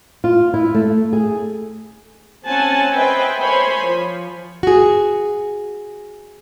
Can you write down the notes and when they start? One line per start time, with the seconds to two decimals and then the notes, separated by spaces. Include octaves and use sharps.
0.24 F4
0.54 E4
0.74 A3
1.13 G#4
2.47 C4 C#4 F#5 G#5 A5
2.93 B4 C5 D#5 E5 G5 G#5
3.40 A#4 C5 C#5 G#5 B5 C6
3.79 F3
4.63 F#4 G#4